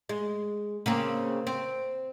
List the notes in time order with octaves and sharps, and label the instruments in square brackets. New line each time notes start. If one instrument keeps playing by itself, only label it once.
[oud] G#3
C#3 A#3 C4
C4